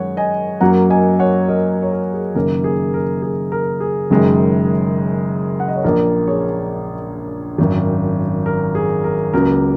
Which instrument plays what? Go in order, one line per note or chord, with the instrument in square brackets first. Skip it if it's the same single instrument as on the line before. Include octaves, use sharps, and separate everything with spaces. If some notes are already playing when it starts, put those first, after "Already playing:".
Already playing: [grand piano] F#2 D#3 G#3 C#5 F#5
D#5 G#5
F#2 F#3 A#3 F#5 A#5
D#5 G#5
C#5 F#5
A#4 D#5
C#5
A#4
G#4
F#1 F#2 D#3 A#3 A#4
G#4
A#4
G#4
A#4
G#4
F#1 F#2 D#3 G#3
F#5
D#5
C#5
A#1 A#2 A#3 A#4
G#4 C#5
G#1 F#2 D#3
A#4
G#4
A#4
C#2 C#3 F#3 A#3 A#4